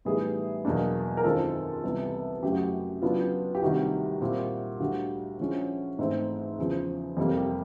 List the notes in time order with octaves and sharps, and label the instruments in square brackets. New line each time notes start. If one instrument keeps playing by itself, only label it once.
[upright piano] A2 E3 G3 B3 D#4 G#4
E2 B2 F#3 A#3 D4
A#4
F#2 D#3 G#3 C4 F4 A4
C2 C3 E3 G3 B3
F#2 C#3 F#3 A3 G4
F#4
G4
C#3 F#3 B3 D4 F4
G4
D2 C3 D#3 G3 F#4
A#2 G3 C4 E4
D2 D3 G3 F#4
D3 F3 G#3 C#4 E4
G#2 E3 A3 C4
E2 C#3 F3
F2 C3 E3 G3 A#3
G4